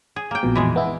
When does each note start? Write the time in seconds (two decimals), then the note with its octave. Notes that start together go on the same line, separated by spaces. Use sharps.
0.16 G#4
0.31 A#3 G5
0.43 A#1 F2 B2
0.55 E3 G#3 G#4
0.76 B3 E4